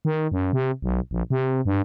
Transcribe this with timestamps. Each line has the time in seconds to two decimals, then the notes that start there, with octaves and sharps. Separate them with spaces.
0.05 D#3
0.32 F#2
0.53 C3
0.82 B1
1.11 A#1
1.30 C3
1.65 G2